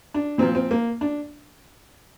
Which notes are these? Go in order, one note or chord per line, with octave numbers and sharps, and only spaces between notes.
D4
A#2 F3 C4
C4
A#3
D4